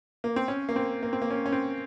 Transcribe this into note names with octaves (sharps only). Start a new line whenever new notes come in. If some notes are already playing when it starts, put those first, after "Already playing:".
A#3
C4
C#4
A#3
C4
A#3
C4
A#3
C#4
C#4
C4